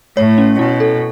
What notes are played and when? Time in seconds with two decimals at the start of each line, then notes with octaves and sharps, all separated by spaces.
0.17 A2 C#5
0.38 C#4
0.59 B2 E4
0.80 A4